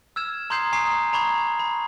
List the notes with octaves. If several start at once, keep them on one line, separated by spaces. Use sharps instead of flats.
E6 F6 G#6 E7
A#5 C6 D#6 G6 G#6 C7
G#5 A#5 C#6 D#6 C7
A#5 B5 C#6 G#6
B5